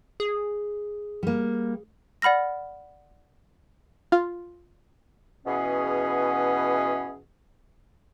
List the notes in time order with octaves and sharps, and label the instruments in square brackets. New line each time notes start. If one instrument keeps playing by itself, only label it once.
[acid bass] G#4
[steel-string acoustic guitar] G3 A#3
[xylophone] D5 F#5 B5 F6 A#6
[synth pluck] F4
[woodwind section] B2 E3 C#4 G#4